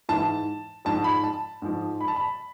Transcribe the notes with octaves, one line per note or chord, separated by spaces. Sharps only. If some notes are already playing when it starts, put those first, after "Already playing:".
G#2 E3 A5
G#2 F3 A5
B5
A5
G#2 F3
B5
A5
B5